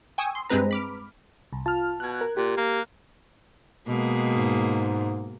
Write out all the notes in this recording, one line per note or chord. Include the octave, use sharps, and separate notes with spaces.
G5 G#5 C#6 D#6 E6
C6
G2 G#3 C4 B4 A#5
B5 D6 F6
C2
F4 A5 F6
B2 F#6 G#6
A#4
A#2 G4
A#3
B2 G#3 A#3
G#2